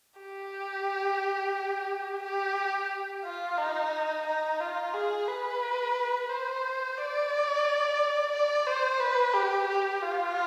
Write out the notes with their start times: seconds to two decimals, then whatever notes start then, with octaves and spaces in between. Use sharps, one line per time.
0.20 G4
2.23 G4
3.24 F4
3.58 D#4
4.26 D#4
4.60 F4
4.94 G#4
5.27 B4
6.29 C5
6.97 D5
8.32 D5
8.66 C5
8.99 B4
9.33 G4
9.68 G4
10.02 F4